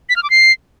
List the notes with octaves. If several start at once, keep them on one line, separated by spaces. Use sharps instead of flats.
B6
F6
D6
C7